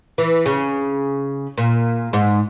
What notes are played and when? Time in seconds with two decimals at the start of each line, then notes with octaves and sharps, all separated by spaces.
0.18 E3
0.46 C#3
1.58 A#2
2.13 G#2